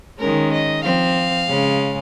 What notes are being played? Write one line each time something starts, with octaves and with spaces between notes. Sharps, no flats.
D#3 G#3 C#4 A#4
D#5
F3 C4 F5
C#3 G#3 C#4